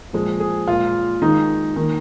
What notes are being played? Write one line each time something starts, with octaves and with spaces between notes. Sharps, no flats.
A#2 F3 G#3
G#4
A#2 G#3 F4
D#3 G#3 D#4
D#3 A#3